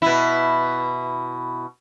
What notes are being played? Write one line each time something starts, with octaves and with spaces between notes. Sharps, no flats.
B2 E4